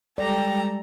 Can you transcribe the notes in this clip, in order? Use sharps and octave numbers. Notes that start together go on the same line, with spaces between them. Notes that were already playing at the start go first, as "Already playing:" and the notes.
G3 G#3 G4 A4 D5 G5 A#5